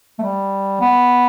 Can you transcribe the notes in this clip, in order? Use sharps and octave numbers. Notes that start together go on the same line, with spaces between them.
A3
G3
B3